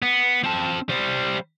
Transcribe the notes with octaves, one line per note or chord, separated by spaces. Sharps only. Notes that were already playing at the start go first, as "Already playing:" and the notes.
B3
C4 A5
G3 C5